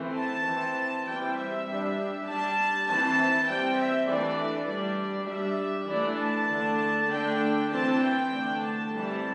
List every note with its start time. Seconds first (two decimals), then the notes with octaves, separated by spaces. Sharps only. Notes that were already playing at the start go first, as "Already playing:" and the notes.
Already playing: E3 A3 C4
0.15 A5
0.45 E3 C4
1.05 E3 G3 C4 G5
1.35 E5
1.66 G3 D4
2.26 G3 D4 A5
2.86 E3 C4 A5
3.47 G3 C4 G5
3.78 E5
4.07 E3 A3 D4 D5
4.68 G3 D4 D5
5.28 G3 D4 E5
5.88 E3 A3 D4 D5
6.18 A5
6.49 D3 A3 D4
7.10 D3 A3 D4 G5
7.69 E3 C4 A5
8.01 G5
8.30 D3 A3 D4
8.61 A5
8.91 E3 G3 C4